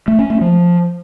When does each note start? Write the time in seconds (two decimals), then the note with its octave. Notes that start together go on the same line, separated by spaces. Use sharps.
0.08 A3
0.19 C#4
0.30 A3
0.41 F3